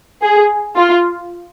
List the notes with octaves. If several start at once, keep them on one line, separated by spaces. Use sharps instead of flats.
G#4
F4